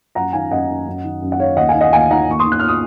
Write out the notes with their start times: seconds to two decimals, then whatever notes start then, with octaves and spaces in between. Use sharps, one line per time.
0.15 F#2 F#5 A#5
0.33 D#3 F5 G#5
0.51 F#2 D#5 F#5
0.69 D#3
0.86 F#2
1.04 D#3
1.22 F#2
1.32 F#5
1.39 D#3 C#5 F5
1.57 D#2 D#5 F#5
1.69 F5 G#5
1.75 D#3
1.81 D#5 F#5
1.92 D#2 F5 G#5
2.11 D#3 F#5 A#5
2.29 D#2 C#6
2.39 C6 D#6
2.46 D#3
2.52 F#6
2.60 F6
2.68 D#6